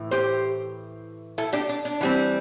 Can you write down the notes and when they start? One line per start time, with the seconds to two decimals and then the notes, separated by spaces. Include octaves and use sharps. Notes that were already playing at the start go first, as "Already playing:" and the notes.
Already playing: A2 E3
0.11 G4 C5
1.38 E4 A4
1.53 D4 G4
1.69 D4
1.85 D4
2.01 E3 G3 C4